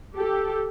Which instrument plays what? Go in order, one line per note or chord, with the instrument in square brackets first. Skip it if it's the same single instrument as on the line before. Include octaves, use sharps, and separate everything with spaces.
[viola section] G4 A4